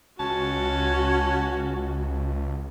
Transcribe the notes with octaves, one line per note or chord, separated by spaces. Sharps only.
C#2 C#4 F#4 A5